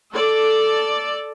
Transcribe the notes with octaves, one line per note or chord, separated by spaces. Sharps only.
A4 D5